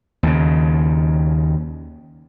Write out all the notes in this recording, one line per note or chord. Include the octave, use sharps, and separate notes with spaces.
D#2 C#3